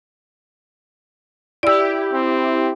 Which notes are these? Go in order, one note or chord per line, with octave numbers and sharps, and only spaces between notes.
E4 G4 D5 E6
C4